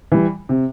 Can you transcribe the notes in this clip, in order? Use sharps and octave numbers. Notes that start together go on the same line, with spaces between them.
E3 G3
C3